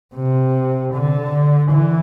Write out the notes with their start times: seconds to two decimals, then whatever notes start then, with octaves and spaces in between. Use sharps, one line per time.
0.15 C3
0.93 D3
1.72 E3